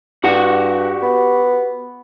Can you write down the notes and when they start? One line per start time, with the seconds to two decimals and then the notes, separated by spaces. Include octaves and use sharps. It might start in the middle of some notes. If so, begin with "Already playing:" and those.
0.24 G2 F#4 G4 F#5
1.03 B3